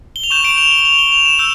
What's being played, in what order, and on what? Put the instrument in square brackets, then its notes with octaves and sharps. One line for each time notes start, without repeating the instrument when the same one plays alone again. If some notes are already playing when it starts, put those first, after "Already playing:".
[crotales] G7
F7
C#6 G6 E7
D7
F7
G7
F7
G7
F7
E7
E6 G6 E7